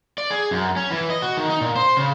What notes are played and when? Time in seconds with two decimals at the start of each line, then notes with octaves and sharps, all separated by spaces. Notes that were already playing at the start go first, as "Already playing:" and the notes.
0.18 D5
0.31 G#4
0.51 F#2
0.76 C#4
0.91 E3
1.10 D#5
1.22 F#4
1.37 D#3
1.50 D#4
1.61 A#2
1.76 C5
1.97 C#3